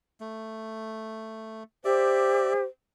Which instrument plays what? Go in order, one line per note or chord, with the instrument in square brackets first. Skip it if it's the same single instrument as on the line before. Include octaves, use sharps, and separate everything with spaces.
[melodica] A3
[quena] G4 [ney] C5 [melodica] D5 E5